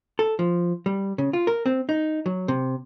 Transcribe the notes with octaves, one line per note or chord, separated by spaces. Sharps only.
A4
F3
G3
C#3
F4
A#4
C4
D#4
F#3
C3